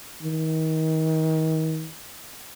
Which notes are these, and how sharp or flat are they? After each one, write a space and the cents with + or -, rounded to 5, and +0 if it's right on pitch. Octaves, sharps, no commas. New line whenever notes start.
D#3 +35